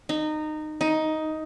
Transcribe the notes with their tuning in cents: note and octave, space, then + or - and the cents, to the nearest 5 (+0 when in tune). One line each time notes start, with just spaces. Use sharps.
D#4 -20
D#4 +10